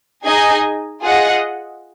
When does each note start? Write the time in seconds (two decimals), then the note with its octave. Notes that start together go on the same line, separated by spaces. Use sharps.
0.24 D#4 G#4 D#5 G#5
1.02 F4 G#4 D#5 F#5